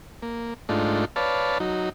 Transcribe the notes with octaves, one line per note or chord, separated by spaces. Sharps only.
A#3
G#2 A3 D4 D#4 F4
B4 C#5 D5 F5 A5
F#3 D#4